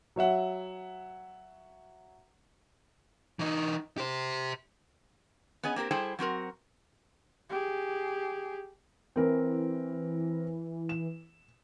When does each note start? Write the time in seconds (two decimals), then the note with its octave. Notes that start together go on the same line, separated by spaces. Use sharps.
0.16 F#3 C#5 E5 F#5
3.39 E3 D#4
3.98 G4 C5
5.63 B3 C#4 G#4 D#5
5.76 A#3 C4 G4 A#4
5.91 G3 E4 G#4 A4 C5 G5
6.19 F#3 C4 F#4 A#4
7.50 G4 G#4
9.16 E3 C4 A#4
10.89 E7